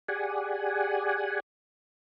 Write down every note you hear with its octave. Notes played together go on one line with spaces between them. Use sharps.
G4 G#4 D5 F#5 G#5